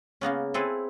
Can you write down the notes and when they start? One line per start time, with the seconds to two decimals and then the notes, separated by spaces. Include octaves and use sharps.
0.21 C#3 A#3 B3 C#4
0.54 C4 E4 G#4 A4 B4